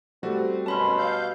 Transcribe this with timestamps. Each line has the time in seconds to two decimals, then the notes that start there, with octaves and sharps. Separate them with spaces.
0.23 G3 A3 C4 F#4
0.66 F#2 B2 C#4 A5 B5 C6
0.99 F5 E6 G6